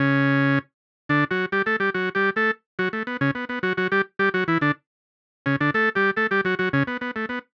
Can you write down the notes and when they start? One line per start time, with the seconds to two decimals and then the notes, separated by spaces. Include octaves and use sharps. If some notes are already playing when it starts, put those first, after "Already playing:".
Already playing: C#3 C#4
1.09 D3 D4
1.31 F#3 F#4
1.52 G3 G4
1.66 A3 A4
1.80 G3 G4
1.94 F#3 F#4
2.15 G3 G4
2.36 A3 A4
2.79 F#3 F#4
2.93 A3
3.07 B3
3.21 C#3 C#4
3.35 B3
3.49 B3
3.63 F#3 F#4
3.77 F#3 F#4
3.92 G3 G4
4.19 G3 G4
4.34 F#3 F#4
4.48 E3 E4
4.61 D3 D4
5.46 C#3 C#4
5.61 D3 D4
5.74 A3 A4
5.95 G3 G4
6.17 A3 A4
6.31 G3 G4
6.45 F#3 F#4
6.59 F#3 F#4
6.73 C#3 C#4
6.87 B3
7.01 B3
7.16 A3
7.29 B3